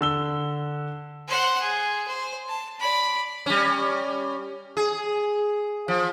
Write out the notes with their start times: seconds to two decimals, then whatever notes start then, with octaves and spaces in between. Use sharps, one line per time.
0.01 D3 E6 G7
1.28 C5 F#5
1.61 G#4
2.07 C5
2.48 A5
2.79 D5 B5
3.46 G3 C#4
4.77 G#4
5.88 F3